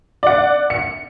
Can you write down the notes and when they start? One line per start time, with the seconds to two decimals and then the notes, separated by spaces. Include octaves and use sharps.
0.23 D5 F#5
0.70 C#7